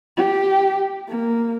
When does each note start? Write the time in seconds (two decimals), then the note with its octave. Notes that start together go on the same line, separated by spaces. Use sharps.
0.17 G4
1.08 A#3